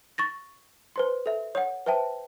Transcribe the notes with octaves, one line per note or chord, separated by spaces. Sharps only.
C#6 A6 A#6
B4 C5 C6
A4 E5
C#5 F#5
B4 C5 E5 G5 A5